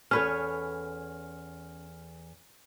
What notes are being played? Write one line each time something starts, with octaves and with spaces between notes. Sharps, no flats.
E2 C#4 A4 B4 C#5 F6